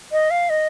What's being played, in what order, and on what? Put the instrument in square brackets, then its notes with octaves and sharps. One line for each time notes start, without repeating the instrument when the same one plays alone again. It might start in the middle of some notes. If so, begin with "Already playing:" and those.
[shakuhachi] D#5
F5
D#5